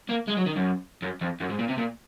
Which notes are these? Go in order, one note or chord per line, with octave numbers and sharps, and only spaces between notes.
A#3
G#3
F#3
D#3
F#2
F#2
F2
F#2
G#2
A#2
C3
A#2